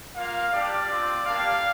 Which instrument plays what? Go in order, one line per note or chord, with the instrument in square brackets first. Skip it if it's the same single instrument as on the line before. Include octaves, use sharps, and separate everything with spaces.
[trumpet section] A#3 F4 F5
G3 D4 G4 D5
C4 F4
A#3 D4 G4 F5